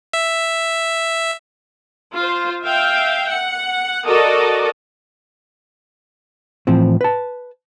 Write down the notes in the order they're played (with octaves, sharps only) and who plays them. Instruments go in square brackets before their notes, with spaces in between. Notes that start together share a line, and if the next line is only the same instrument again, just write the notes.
[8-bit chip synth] E5
[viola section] F4 C5
E5 F5 G5
F#5
F#4 A4 A#4 D5 D#5
[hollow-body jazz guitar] A2 E3 F3 C4
B4 A5